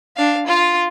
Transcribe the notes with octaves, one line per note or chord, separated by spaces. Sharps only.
D4 F5
F4 F5